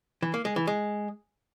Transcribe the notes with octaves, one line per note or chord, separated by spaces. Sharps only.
E3
A#3
G#3
E3
G#3